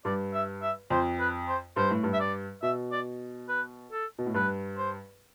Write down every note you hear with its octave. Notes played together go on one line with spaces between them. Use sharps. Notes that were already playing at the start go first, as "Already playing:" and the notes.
G2 D5
E5
E5
F2 C5
B4
C5
G2 C5
A2
G2
E5
D5
B2 E5
D5
B4
A4
B2
A2
G2 B4
C5